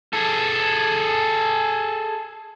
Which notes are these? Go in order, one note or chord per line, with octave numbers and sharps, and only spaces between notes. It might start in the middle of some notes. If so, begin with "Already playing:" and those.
G#4 A4